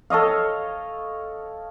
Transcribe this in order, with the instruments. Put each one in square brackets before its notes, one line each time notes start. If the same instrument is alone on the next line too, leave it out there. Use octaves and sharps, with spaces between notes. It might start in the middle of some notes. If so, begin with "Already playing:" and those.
[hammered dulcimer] A4 C#5 D#5 F5